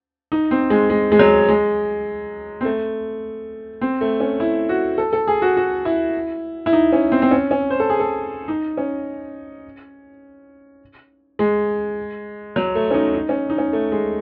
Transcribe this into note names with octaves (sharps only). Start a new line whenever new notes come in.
D#4
C4
G#3
G#3
G#3
F#3
G#3
C4
A3
C4
A3
C#4
E4
F#4
A4
A4
G#4
F#4
F#4
E4
E4
D#4
C#4
C4
C4
C#4
C#4
C5
A4
G#4
A4
D#4
C#4
G#3
F#3
A3
C#4
D#4
D#4
C#4
D#4
C#4
A3
G#3